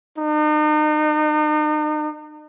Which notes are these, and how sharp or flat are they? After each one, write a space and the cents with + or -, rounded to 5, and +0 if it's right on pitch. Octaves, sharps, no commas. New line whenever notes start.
D#4 -40